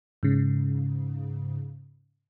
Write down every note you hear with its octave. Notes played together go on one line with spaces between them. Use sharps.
G#2 C#3